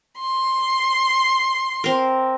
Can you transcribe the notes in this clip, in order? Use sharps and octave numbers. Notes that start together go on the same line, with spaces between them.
C6
C4 A#4